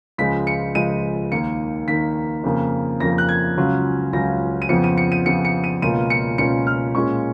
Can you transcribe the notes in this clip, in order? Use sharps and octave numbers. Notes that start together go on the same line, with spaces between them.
C#2 C#3 F3 G#3 B6
C#7
C#2 C#3 F3 G#3 D#7
D#2 D#3 A#3 C#7
D#2 D#3 A#3 B6
F2 C#3 F3 A#3
F2 C#3 F3 A#3 A#6
F#6
G#6
C#2 C#3 F#3 C#4 F4
C#2 C#3 F#3 C#4 F4 A#6
D#7
F2 C#3 F3 B3 C#7
D#7
C#7
D#7
F2 C#3 F3 B3 C#7
C#7
D#7
C#2 B2 A#3 C#4 F4 D#7
C#7
C#2 B2 A#3 C#4 F4 C#7
F6
A#2 G#3 C#4 F4 C#6